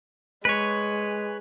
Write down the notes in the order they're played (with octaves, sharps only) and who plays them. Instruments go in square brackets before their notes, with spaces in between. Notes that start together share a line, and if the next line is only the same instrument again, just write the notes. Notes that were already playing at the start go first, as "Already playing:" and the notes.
[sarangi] G#3 [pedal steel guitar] B4 C#5